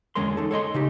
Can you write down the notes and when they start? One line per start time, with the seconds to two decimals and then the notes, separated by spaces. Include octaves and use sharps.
0.15 E2 D3 G#3 C#4 A#4 C6
0.37 D#4 A4
0.51 A4 C#5 D#5 C6
0.74 C#3 D#4 G4